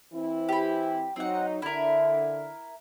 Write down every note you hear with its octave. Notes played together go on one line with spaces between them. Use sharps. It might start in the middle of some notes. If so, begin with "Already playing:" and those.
E3 C4 E4
G4 B5
F#3 C4 D#4 F#5
D3 E4 A#4